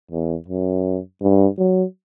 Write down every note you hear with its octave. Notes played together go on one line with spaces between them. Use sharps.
E2
F#2
G2
F#3